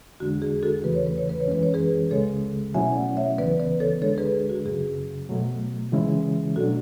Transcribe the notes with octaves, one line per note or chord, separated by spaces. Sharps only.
E2 D3 G#3 D4 F#4
G#4
F#4 A4
E2 C#3 E3 A3 B4
C#5
B4
C#5
B4
C#5
F#2 E3 G#3 C#4 B4
C#5
G#4 B4
C#2 C#3 G#3 A4 C#5
B2 F#3 A3 C#4 E4 E5 G#5
D5 F#5
C#5 E5
C#2 C#3 E3 B3 B4 D5
B4 D5
A4 C#5
D2 D3 G#3 D4 A4 C#5
G#4 B4
F#4
F#2 C#3 F#3 G#4
B2 F#3 A3
C#3 E3 G#3 C#4 E4
B2 F#3 A3 D4 F#4 A4